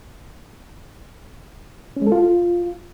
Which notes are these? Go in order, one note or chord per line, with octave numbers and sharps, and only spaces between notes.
C#4
G#3
A4
F4